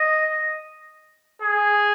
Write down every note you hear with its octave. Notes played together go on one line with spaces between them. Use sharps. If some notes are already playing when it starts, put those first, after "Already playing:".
Already playing: D#5
G#4